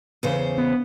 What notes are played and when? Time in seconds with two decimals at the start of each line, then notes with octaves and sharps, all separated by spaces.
0.23 E2 C#3 C5
0.58 B3